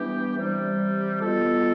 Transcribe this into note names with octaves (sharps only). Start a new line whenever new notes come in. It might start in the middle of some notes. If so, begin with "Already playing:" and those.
Already playing: E3 G3 B3 D4 G4
C3 E3 G3
B2 G3 B3 F4 A4